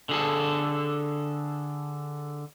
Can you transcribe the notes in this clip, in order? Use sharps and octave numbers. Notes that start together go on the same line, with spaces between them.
D3 G#4 A4